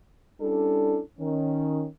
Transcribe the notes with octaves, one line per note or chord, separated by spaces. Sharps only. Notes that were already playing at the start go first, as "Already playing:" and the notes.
G3 C#4 D4 E4 A4
D#3 C#4